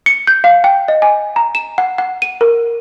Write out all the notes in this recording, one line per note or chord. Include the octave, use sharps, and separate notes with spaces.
C#7
G6
F5
G5
D#5
G#5
A#5
E7
F#5
F#5
D#7
A#4